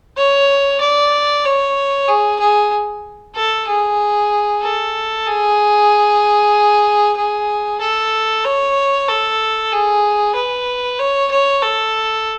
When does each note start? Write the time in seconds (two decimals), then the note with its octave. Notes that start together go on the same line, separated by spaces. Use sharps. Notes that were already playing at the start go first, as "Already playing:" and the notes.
0.17 C#5
0.81 D5
1.45 C#5
2.08 G#4
2.40 G#4
3.35 A4
3.67 G#4
4.62 A4
5.26 G#4
7.17 G#4
7.80 A4
8.45 C#5
9.08 A4
9.72 G#4
10.35 B4
10.99 C#5
11.31 C#5
11.62 A4